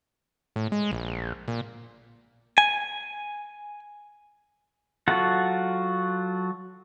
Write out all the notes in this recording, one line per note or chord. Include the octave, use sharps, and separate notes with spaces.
A2
G#3
A#1
A#2
G#5
F#3 F4 F#4 A4 F#5